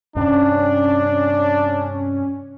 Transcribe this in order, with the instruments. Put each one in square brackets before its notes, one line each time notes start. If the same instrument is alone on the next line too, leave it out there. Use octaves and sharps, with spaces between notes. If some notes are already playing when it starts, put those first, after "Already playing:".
[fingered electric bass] G2 C3 [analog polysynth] C#4 [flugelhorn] D4